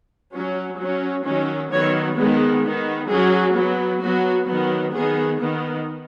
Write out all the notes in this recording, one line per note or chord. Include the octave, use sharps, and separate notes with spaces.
F#3 C#4
F#3 C#4
D#3 F#3 C#4
D#3 F#3 B3 C#5
D#3 G#3 B3
D#3 B3
F#3 C#4 G#4
F#3 B3
F#3 B3 F#4
D#3 F#3 B3
D#3 B3 G#4
D#3 B3